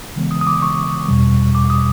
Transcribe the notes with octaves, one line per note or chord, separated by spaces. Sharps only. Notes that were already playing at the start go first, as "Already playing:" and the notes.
C#3 E3 G#3 B3
D#6
D#6
D6
C#6
E2 B2 G3
D6
D#6